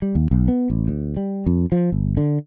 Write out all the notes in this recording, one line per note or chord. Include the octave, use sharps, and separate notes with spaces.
G3
D#2
B1
B3
A1
D2
G3
F2
F3
G1
D3